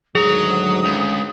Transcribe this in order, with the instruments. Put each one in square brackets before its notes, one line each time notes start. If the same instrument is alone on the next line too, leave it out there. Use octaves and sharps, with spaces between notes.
[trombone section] D2 G#2 D#3 [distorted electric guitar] F#3 A#5 [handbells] G#4 [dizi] D#6
[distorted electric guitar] C#2